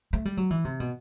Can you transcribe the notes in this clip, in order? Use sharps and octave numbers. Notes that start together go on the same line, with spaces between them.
A3
G3
F#3
E3
C3
B2